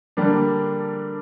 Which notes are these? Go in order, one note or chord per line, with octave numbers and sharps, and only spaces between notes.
D3 G3 A#3 D4